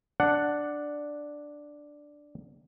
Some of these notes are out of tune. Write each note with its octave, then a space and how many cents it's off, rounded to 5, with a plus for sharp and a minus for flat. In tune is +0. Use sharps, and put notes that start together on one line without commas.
D4 +0 F#5 +0